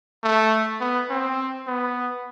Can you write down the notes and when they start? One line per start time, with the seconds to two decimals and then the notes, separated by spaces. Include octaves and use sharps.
0.24 A3
0.81 B3
1.10 C4
1.67 B3